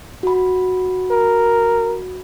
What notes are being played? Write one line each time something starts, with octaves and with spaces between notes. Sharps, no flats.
F#4 B5
A#4